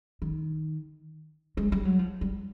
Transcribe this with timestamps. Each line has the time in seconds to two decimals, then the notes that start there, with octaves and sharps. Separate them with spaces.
0.22 D#3
1.57 G#3
1.72 G3
1.85 F#3
1.99 F3
2.21 G3